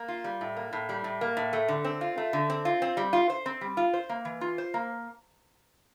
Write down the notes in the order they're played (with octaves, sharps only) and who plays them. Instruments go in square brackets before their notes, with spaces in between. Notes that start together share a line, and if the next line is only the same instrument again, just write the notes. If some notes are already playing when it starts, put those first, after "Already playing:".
Already playing: [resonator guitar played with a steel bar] A#3
F4
G3
A2
A#3
A2
G3
A2
A#3
A2
A3
D3
C4
F4
A3
D3
C4
F4
C4
G3
F4
C5
C4
G3
F4
C5
A#3
E3
F4
C5
A#3